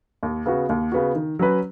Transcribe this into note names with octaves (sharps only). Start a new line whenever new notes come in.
D#2
C#3 B3 F#4
D#2
C#3 B3 F#4
D#3
F#3 C#4 B4